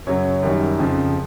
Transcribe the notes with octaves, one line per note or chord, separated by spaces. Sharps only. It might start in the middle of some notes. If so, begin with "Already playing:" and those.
F#2 C#3 F#3 C#5
F#2 D#3 G3
F2 C#3 F3